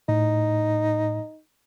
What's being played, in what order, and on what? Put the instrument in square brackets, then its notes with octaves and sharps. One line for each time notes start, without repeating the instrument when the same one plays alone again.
[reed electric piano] A2 [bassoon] D#4